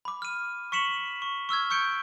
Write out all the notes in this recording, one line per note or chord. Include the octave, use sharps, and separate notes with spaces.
B5 D6
F6 D#7
C#6 B6 C#7 E7 F#7
C#6
C#6 E6 F6 G#6
C#6 G6 C#7 D7 G7